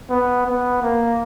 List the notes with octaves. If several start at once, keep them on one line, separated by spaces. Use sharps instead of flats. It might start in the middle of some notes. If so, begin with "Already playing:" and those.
B3
B3
A#3